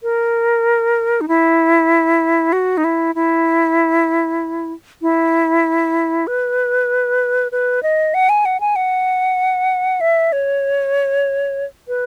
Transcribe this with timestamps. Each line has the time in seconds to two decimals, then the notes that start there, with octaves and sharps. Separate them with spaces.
0.03 A#4
1.21 D#4
1.28 E4
2.53 F#4
2.77 D#4
2.84 E4
3.15 E4
5.02 E4
6.27 B4
7.52 B4
7.83 D#5
8.14 F#5
8.29 G#5
8.45 F#5
8.60 G#5
8.76 F#5
10.01 E5
10.32 C#5
11.88 B4